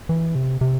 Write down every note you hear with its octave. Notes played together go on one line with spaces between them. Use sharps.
E3
C3
C3